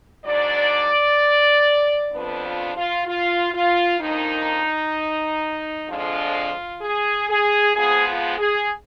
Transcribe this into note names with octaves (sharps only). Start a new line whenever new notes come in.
G#2 F#3 D4 D5
F2 F3 B3 D4 B4
F4
F4
F4
F4
F2 D#3 A#3 D4 D#4
F2 D3 F3 G#3 D4 F4
G#4
G#4
F2 F3 G#3 B3 G#4
F4
G#4